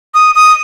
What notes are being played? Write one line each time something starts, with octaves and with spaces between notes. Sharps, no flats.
D#6
D#6